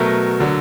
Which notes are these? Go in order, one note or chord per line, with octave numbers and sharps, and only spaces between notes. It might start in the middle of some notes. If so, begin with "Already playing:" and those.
Already playing: B2 F#3 A3 A#4
D3 F#3